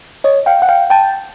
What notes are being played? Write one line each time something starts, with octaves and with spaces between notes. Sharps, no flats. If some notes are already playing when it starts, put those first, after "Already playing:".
C#5 D#5
F5 G5
F#5
F5 G5
G5 A5